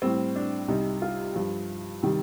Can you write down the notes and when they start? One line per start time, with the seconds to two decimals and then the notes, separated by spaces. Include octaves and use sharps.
0.02 A2 G3 C4
0.36 D4
0.68 C2 C3 G3 D#4
1.02 F4
1.35 G2 F3
2.03 C3 D#3 G3